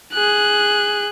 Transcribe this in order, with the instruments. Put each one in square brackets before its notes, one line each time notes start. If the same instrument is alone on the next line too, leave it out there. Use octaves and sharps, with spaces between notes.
[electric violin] G#4 F#6